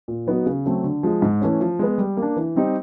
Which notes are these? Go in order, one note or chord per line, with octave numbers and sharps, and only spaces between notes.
A#2
F#3 B3 D#4 F#4
C#3
F#3 A3 C4
D3
F3 G#3
G#2
E3 A3 C#4
F3
G#3 B3
G3
A#3
D4
E3
G3 C4 D#4 G4